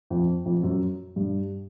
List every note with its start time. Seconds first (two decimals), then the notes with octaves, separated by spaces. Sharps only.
0.10 F2
0.46 F2
0.63 F#2
1.16 G2